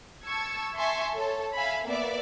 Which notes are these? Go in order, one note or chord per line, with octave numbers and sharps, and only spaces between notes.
A5 C#6 E6 G#6 C#7
E5 G#5 A5 C6 C#6
A4 C#5 A5
E5 F5 G#5 B5
A#3 B3 D5 E5